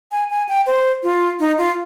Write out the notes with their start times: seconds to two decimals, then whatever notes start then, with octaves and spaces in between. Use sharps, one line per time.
0.12 G#5
0.31 G#5
0.49 G5
0.67 C5
1.03 F4
1.40 D#4
1.58 F4